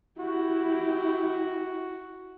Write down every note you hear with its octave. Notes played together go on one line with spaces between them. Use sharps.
E4 F#4 G4